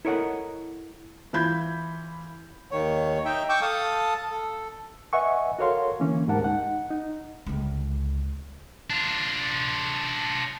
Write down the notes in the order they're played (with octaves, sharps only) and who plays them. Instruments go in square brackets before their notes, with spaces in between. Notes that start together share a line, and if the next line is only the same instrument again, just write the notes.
[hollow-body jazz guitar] E4 A4 A#4 C#5 D#5 F#5
[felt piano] E3 F4 B5 G6 G#6
[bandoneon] D#2 D#3 C#5
D#4 E5 G5
G5 C#6 D6 E6 G6
A4 F5 A5 D#6
A4
[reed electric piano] B4 D#5 E5 F#5 G#5 C#6
F#4 A4 A#4 C#5 F5 C6
D3 E3 A#3 C#4
D2 G#2 G4 A#4 F#5 A5
D#4 F#5
D#4
[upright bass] C#2 D3
[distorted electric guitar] D4 F4